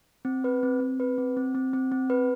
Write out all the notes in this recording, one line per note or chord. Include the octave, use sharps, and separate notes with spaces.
C4
B4
C4
C4
B4
C4
C4
C4
C4
C4
B4